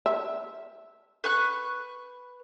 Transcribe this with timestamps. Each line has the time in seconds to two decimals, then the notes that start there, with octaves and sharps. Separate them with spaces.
0.06 E5
1.24 B4 C#6 F#6